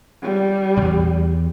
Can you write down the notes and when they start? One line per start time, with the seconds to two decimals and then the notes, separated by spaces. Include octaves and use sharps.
0.22 G3
0.78 B1 E2